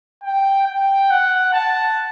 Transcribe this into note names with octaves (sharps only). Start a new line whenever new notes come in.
G5
G5
F#5
A5